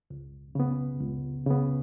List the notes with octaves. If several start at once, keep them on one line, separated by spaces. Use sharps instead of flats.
C#2
C#3 B3
C#2
C#3 B3